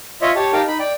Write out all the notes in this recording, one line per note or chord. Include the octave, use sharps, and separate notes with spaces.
F4 C#5 D#5 E5
G4 C#5 A5
D#4 G4 A#4 F5 G5 A5
D#4 B5
D5 G5